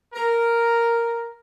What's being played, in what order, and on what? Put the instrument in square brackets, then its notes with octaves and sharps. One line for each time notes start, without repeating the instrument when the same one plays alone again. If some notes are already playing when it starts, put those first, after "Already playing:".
[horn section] A#4